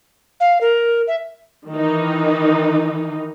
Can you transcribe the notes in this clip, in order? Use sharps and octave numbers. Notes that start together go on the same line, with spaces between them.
F5
A#4
E5
D#3 E3 D#4